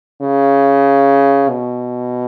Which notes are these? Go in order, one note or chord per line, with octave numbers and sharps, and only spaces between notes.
C#3
B2